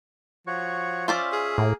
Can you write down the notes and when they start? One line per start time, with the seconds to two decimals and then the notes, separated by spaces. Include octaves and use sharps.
0.47 F3 F#4 C#5 C#6
1.08 C#4 F4 C5 D5 E5
1.32 G#4
1.58 A2 A#3 A#4